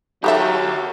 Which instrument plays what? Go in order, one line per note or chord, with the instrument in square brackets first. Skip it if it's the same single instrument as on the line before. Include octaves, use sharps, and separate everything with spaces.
[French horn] F#3 [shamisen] D#4 A4 E5 [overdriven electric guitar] G4 A#4